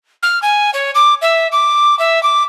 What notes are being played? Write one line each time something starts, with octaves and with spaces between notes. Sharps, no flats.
F6
G#5
C#5
D6
E5
D6
E5
D6